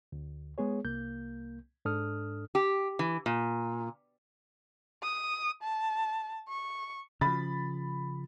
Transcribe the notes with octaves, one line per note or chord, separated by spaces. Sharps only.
D2
G#3 B3 G#4 C#5
C2 A#3 G6
G#2 D4 A4 D#6 F6
G4
E3
A#2
D#6
A5
C#6
C#3 F3 B5 A6